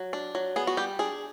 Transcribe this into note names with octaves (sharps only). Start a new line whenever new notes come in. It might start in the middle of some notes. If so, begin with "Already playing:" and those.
Already playing: F#3
D4
F#3
B3 G#4
F#4
G3 G4
D4 G#4